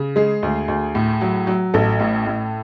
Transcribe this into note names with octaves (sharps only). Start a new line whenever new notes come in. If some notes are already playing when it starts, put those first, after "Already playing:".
Already playing: C#3
G#3 G#4
D2
D2
A2
F#3
F#3
A1 A4
A2
A2